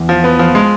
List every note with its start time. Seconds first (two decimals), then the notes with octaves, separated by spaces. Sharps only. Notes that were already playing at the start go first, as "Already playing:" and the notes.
Already playing: E2
0.09 F3
0.24 B3
0.39 F3
0.55 G#3